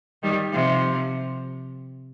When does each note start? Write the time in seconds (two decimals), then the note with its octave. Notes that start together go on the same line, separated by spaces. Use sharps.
0.23 D#3 G3
0.52 C3 F3